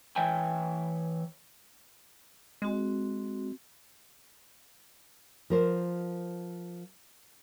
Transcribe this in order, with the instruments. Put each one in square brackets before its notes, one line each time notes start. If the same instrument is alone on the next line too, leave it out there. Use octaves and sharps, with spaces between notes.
[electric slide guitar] E3 C#5 E5 G5 G#5
[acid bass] G#3 [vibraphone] C4 F#4
[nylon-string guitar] F3 A#4 C5